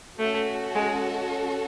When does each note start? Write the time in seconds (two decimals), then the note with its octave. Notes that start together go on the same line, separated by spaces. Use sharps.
0.19 A3 C#4 F#4 A4
0.75 G#3